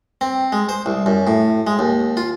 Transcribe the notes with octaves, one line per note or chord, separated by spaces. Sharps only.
C4
G#3
C5
C2
F#2
A2
G#3
D#2
F4